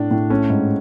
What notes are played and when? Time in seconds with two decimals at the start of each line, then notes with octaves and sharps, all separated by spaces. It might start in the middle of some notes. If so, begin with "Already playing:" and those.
Already playing: A2 A3 D4
0.11 A2
0.30 A3 C#4
0.50 G#2